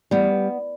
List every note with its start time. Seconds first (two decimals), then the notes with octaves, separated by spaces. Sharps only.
0.11 E2 G3 B3